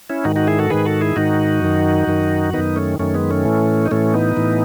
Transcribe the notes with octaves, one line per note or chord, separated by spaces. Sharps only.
C#4 E4
G#2 D#3 D#4 F#4
D#4 F#4
E4 G#4
F#4 A4
G#2 D#3 G#4 B4
F#4 A4
E4 G#4
G#2 D#3 D#4 F#4
F#2 D#3
F#2 D#3
F#2 D#3 B3 D#4
A3 C#4
F#2 D#3 A3 C#4
G#3 B3
A3 C#4
A2 E3
D#4
A2 E3 A3 C#4
B3 D#4
A2 E3